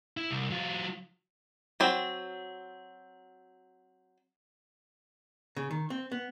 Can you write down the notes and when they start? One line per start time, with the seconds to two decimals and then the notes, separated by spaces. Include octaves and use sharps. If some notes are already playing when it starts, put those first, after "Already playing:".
0.17 E4
0.31 C2
0.50 F#3 F4
1.80 F#3 C4
5.56 C#3
5.71 D#3
5.90 C4
6.12 B3